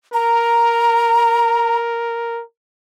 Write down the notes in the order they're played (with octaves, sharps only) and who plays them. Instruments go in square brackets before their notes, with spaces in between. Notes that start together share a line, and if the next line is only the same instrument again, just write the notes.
[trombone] A#4 [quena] A#5